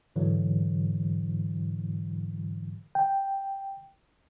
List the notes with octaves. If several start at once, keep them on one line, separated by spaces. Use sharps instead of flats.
G#2 D3 E3 F#3
G5